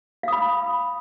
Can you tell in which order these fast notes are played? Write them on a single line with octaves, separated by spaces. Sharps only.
F5 D#6 B5